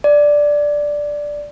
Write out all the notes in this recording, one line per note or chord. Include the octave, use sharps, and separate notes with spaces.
D5